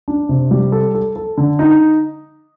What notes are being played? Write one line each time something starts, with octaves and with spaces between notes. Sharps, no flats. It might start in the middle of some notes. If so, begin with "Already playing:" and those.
D4
C3
G3
A4
A4
A4
D3
D#4